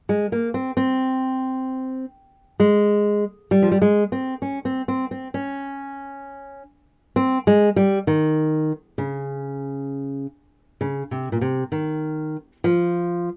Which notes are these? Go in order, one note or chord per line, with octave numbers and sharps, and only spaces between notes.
G#3
A#3
C4
C4
G#3
G3
F3
G3
G#3
C4
C#4
C4
C4
C4
C#4
C4
G#3
G3
D#3
C#3
C#3
C3
A#2
C3
D#3
F3